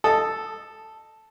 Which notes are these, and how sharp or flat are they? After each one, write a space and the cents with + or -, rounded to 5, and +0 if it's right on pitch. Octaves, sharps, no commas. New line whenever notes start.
A4 +0 D#5 -20 D#6 +0